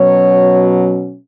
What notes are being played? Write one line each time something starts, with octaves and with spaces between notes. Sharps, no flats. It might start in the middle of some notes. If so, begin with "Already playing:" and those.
Already playing: B2 F#3 C#4 C#5